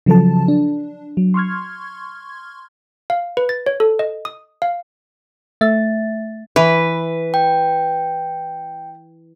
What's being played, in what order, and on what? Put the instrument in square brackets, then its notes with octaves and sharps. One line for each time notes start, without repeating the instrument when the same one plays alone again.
[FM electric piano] C#3 F3 F#3 A4 A5
D4
F#3
C6 C#6 F6 G#6
[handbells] F5
B4
A6
C#5
A4
D#5
D#6
F5
[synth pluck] A3 E5 A6
[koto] E3 [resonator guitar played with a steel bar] B4
[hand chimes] G5